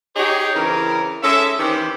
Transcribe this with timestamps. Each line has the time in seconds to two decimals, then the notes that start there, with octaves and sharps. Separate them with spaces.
0.16 D#4 G4 G#4 C#5
0.55 C#3 E3 C4 A#4
1.23 G#3 C#4 A4 E5
1.59 C3 D#3 E3 C#4 G4